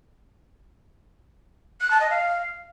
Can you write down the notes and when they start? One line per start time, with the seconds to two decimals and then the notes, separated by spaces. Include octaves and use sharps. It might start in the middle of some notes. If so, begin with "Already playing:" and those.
1.81 F#6
1.91 A5
2.00 D#5
2.10 F5